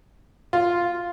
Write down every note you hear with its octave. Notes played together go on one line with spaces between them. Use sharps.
F4